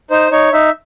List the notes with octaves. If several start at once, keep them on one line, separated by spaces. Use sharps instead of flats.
D#4 C5
D#4 C#5
D#4 E5